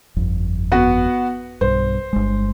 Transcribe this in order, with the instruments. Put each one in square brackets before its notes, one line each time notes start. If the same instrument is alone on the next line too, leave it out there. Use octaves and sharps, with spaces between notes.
[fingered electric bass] G1 F2
[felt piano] B3 F#4
[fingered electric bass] B1 G2 [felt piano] C5
[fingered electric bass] G1 G#3